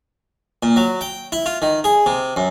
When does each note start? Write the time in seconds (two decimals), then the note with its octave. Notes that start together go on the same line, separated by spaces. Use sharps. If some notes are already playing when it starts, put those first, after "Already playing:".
0.63 A#2
0.76 F#3
1.01 G5
1.32 E4
1.46 F4
1.62 D#3
1.84 G#4
2.06 C3
2.36 F#2